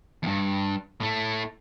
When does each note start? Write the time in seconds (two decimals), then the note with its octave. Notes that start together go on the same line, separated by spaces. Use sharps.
0.23 E2 G2
1.00 A2 A3